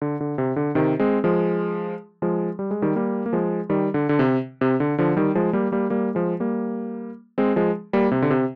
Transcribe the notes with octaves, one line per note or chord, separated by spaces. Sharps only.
D3
D3
C3
D3
C3 D#3
G#3 C4
F3 G#3
F3 G#3
G3
G#3
D#3 G3
G3 A#3
A#3
F3 G#3
D#3 G3
D3
D3
C3
C3
D3
D3 F3
D#3 G3
F3 G#3
G3 A#3
G3 A#3
G3 A#3
F3 G#3
G3 A#3
G#3 C4
F3 G#3
G3 A#3
C3
D3
C3